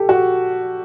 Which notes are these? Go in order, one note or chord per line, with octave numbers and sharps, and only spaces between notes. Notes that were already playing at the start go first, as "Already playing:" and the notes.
Already playing: G4 A4
F#4